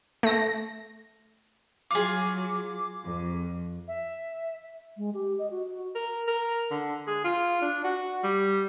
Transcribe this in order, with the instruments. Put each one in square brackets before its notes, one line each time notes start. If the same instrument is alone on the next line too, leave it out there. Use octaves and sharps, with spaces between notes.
[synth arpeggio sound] A3 A#6
[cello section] F#3 [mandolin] F4 G#4 [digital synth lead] D6
[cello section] F2
[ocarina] E5
[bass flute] G#3
G4
D#5
F#4
[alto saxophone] A#4
A#4
D3
G#4
F4
D4
F#4
G3